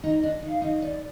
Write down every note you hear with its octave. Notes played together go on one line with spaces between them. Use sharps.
D#4 D#5
D4 D#5
D#4
F5
D#4 D#5
D#4 D5